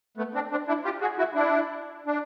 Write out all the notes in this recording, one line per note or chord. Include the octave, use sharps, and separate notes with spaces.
A3 B3
C4 D4
C4 D4
D4 E4
F4 G4
F#4 G#4
E4 F#4
D4 E4
D4